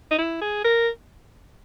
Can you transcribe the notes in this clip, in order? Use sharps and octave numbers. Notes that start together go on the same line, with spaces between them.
D#4
E4
G#4
A#4